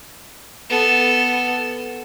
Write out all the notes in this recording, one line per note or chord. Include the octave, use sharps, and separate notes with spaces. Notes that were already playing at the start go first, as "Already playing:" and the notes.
B3 A4